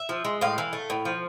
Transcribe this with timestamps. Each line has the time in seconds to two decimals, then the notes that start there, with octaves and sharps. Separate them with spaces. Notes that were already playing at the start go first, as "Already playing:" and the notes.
Already playing: E5
0.09 F3
0.25 G#3
0.41 A2 F5
0.58 E3
0.73 A3
0.90 A2
1.05 F3